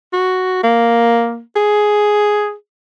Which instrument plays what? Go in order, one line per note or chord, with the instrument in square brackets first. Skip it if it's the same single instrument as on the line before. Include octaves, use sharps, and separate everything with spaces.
[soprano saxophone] F#4
A#3
G#4